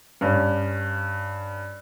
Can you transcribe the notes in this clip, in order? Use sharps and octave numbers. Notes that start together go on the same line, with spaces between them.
G2 C#4